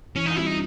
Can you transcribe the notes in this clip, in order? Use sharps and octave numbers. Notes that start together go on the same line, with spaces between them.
E3 C#4
D#4
G3 C4 E4 F4
D#4